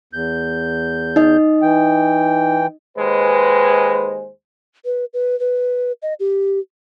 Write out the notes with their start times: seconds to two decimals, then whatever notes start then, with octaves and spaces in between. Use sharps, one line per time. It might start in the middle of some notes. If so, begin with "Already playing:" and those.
0.13 E2 G6
1.16 D#4 D#5
1.62 E3 G5
2.97 D#2 G#3 B4 C5
4.85 B4
5.14 B4
5.40 B4
6.02 D#5
6.20 G4